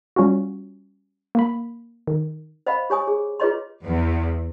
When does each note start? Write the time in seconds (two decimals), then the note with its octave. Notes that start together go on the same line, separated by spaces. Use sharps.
0.16 G3 C#4 F4 F#4
1.35 A#3 B5
2.07 D#3
2.66 C5 D#5 F5 F#5 B5
2.90 G4 C#5 G#5 D#6
3.07 G#4
3.40 F4 G#4 B4 C#5 D#5 C6
3.84 E2